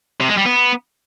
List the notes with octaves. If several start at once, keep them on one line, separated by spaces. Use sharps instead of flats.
C3
G#3
G3
B3